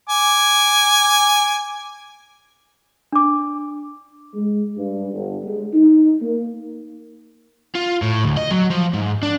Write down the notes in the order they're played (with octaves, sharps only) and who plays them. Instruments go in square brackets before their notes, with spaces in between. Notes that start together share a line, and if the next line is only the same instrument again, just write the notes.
[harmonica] G#5 D6
[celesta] D4 D6
[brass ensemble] G#3
G2
G1
G#3
D#4
A#3
[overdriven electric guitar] F4
A2
D2
D#5
F#3
F3
G#2
D4